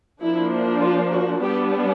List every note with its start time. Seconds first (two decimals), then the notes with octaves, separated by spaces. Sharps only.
0.20 F3 A#3 D4 E4
0.81 F4
1.11 F#4
1.43 G3 B3 D4 G4